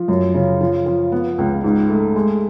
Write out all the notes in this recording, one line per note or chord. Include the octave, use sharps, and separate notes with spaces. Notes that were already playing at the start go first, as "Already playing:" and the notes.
Already playing: F3
F#2
C#3
F3
F3
B3
C#2
G#2
A3
G#3